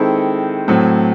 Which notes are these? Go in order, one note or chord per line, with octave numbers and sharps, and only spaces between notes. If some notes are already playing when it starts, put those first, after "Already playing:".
Already playing: D#3 G#3 C4 E4 A4
A2 F#3 C4